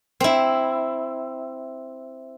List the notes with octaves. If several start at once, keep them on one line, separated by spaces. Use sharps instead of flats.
C4 E4